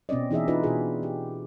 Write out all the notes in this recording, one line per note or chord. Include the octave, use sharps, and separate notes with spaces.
B2 C4 C#4 D5 D#5
E3 D#4 G#4 D#5 E5
D4 D#4 F4 B4 D5
B2 F#4 G#4
G4